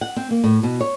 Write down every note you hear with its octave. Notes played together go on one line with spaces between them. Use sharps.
F#5
C4
A#3
A2
B2
C#5